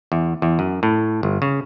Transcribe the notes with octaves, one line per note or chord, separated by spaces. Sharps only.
E2
E2
F#2
A2
G1
C#3